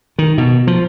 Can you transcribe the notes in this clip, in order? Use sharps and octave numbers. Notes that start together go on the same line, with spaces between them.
D#3
B2
F3